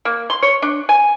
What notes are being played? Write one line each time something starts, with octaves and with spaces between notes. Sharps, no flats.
A#3
C6
C#5
D4
G#5